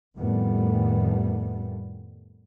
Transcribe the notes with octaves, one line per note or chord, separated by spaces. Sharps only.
F2 A2 D#3 G3 A3 B3